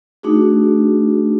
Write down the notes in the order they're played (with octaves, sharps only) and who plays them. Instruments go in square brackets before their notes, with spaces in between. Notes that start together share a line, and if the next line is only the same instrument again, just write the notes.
[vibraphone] A3 D4 D#4 F#4 G#4